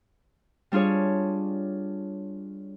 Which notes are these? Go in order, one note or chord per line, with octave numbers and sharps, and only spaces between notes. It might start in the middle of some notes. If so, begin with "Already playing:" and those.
G3 D4 F4 G#4 C#5